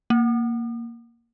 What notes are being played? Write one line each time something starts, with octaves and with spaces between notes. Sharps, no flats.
A#3